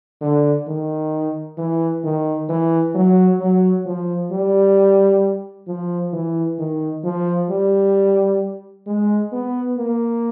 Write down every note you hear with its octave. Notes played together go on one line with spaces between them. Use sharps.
D3
D#3
E3
D#3
E3
F#3
F#3
F3
G3
F3
E3
D#3
F3
G3
G#3
B3
A#3